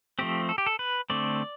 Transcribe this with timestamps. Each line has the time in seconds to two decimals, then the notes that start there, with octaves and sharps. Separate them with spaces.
0.19 F3 A3 C4 G4
0.49 A4
0.58 G4
0.66 A4
0.79 B4
1.10 D3 A3 C4 D5